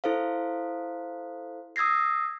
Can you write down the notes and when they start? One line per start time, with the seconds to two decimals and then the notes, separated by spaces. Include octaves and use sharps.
0.04 E4 A4 C5 F5
1.76 D#6 E6 G#6 A#6 C7